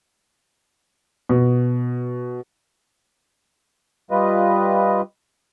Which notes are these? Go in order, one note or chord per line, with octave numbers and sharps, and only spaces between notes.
B2
G3 F4 B4 D#5